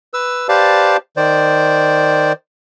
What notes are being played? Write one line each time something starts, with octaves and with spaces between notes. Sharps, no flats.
B4 E6
G4 B4 C5 D5 F5 A5
D#3 C5 D5